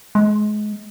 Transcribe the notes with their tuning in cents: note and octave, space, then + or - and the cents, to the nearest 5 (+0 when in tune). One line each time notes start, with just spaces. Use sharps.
G#3 +25